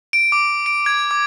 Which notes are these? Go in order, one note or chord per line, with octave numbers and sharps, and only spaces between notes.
D7
D6
D7
G#6
D6